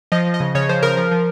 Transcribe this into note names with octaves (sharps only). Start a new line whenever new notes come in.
F3 D#5
F3
D#5
C#3
C#3 C#5
F3 C5
C#3 A#4
F3
F3